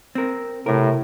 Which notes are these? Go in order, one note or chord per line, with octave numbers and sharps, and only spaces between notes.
C4 A#4
B1 A2 C3 A#4